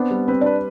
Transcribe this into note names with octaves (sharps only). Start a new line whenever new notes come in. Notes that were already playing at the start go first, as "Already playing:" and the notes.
Already playing: B3 C4 D4
G3
C4 B4
D4 B4